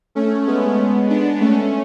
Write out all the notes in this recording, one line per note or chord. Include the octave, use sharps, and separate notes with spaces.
A3 C#4
G#3 B3
B3 D4
A3 C#4